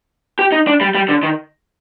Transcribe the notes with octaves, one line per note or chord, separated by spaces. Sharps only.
G4
D#4
D4
G3
G3
D3
D#3